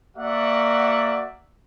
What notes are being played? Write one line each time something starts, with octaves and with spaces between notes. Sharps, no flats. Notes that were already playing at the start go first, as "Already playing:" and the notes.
A#3 F#4 D5 E5 F#5